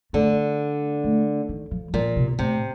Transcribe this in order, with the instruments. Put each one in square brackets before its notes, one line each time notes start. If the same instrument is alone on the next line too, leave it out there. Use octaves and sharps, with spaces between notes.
[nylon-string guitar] D3 [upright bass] A3
[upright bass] A3
D#3
F3
[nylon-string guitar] A#2 [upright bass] F3
[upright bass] C3
[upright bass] A2 [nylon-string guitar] C3